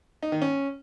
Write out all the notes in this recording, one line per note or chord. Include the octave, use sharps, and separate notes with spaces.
D#4
D#3
C#4